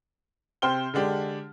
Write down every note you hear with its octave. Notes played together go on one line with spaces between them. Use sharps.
C3 C5 G5 F6 G7
D3 G#3 D4 G4